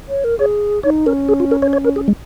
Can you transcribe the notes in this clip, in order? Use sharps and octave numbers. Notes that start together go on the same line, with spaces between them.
C#5
A#4
G#4 C#5
D#4 C#5
C#4 A#4
G#4
F4
A#4
C#5
C#5
A#4
G#4
G#3